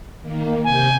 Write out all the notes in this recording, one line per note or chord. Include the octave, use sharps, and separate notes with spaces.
D#3 A#3
C3 G#5 G6